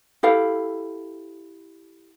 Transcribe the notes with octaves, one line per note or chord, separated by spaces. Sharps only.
E4 G4 A4 F5